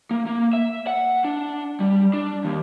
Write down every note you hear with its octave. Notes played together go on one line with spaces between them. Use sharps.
A#3
A#3
E5
F#5
D4
G3
D4
D#2